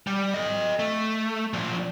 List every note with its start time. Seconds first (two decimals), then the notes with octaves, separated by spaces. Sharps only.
0.07 G3
0.34 A4 D#5
0.79 A3
1.53 A#2 F3